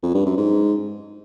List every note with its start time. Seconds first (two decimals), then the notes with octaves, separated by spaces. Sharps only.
0.03 F2
0.15 G2
0.26 F#2
0.37 G#2